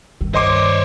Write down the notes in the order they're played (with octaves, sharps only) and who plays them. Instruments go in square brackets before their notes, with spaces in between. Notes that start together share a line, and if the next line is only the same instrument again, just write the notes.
[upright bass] G2 D#3
[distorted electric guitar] C5 C#5 [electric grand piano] D#5 C6 D6